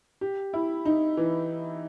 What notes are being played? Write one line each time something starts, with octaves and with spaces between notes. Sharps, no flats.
G4
E4
D#4
E3